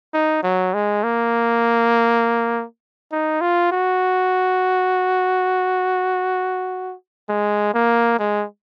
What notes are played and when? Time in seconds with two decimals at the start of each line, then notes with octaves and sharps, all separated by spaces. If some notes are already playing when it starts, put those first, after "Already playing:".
0.14 D#4
0.43 F#3
0.74 G#3
1.03 A#3
3.12 D#4
3.41 F4
3.72 F#4
7.29 G#3
7.74 A#3
8.19 G#3